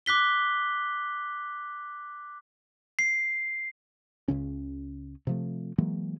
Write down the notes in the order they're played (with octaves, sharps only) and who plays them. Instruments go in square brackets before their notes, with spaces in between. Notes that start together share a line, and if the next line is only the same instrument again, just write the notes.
[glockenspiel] D6 F#6 B6 G7
C7
[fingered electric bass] C#2 C#3 C#4
C3 F3 A3
E3 F#3 G#3 A#3